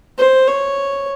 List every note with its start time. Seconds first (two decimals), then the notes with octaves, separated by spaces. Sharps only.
0.18 C5
0.48 C#5